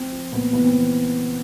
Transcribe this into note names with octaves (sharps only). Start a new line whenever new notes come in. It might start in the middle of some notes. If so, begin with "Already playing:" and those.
Already playing: F3 C4
F3
A#2 B3
E3 B3
C4
E3